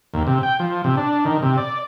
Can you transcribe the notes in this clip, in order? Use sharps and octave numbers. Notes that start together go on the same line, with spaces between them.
D#2
C3
G5
F3
C3
D4
D#3
C3
D5